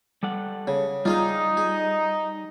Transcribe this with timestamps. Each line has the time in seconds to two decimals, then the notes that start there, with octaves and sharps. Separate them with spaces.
0.23 G3 A4 F#5
0.67 C#3
1.05 G3 D#4 F4 G#4 F5
1.57 G#4